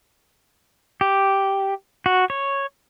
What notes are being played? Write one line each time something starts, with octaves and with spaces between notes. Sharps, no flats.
G4
F#4
C#5